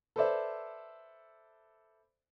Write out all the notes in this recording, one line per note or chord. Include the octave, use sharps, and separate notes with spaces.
A4 B4 C5 D5 E5